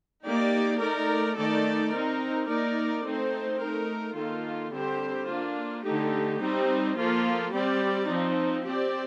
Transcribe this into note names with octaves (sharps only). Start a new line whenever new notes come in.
A#3 D#4 G4 D5
A3 D#4 A#4 D5
D#3 A3 D#4 A4 D5
C4 D#4 A#4
A#3 D#4 A#4 D5
A3 C4 D#4 A4 C5
A3 D#4 A#4
D#3 A#3 F4 A4
D3 G3 C4 G4 C5
A#3 D4 F4
D3 A3 D#4 G4
G3 C4 D#4
F3 A#3 F4 A4
G3 C4 G4 D5
F3 C4 D#4
C4 G4 D5